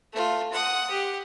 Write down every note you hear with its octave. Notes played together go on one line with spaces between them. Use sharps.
A3 F4
F#5 D#6
G4